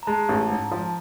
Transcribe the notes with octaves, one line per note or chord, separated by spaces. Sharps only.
A#5
G#3 A5
A1
G#2
F3